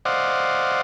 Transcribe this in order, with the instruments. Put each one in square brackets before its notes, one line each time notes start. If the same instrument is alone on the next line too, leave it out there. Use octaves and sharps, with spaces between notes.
[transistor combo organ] C5 D5 D#5 F5 F#5